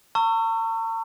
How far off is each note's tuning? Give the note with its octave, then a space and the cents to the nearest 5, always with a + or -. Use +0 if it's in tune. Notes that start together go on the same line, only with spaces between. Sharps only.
A#5 -45 C#6 +0 E6 +30